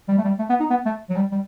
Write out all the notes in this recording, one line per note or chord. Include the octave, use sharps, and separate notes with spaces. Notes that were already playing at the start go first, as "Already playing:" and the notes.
G3
A3
G3
A3
B3
D#4
B3
A3
F#3
G3
G3